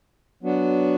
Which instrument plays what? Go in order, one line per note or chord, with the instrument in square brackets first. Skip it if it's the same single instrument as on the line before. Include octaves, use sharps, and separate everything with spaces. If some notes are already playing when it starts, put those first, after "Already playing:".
[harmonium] F#3 B3 D4 F#4